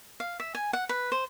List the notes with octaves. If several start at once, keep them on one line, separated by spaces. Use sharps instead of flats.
F5
E5
G#5
F#5
B4
C5